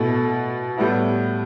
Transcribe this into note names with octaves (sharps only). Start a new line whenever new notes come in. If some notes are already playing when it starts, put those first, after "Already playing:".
Already playing: B2 A3 E4
A2 G3 B3 E4